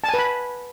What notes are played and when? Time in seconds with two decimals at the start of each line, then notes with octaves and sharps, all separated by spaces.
0.04 A5
0.09 G#5
0.14 B4
0.19 B5